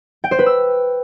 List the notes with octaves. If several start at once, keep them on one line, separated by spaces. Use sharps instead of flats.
G5
C5
B4
E6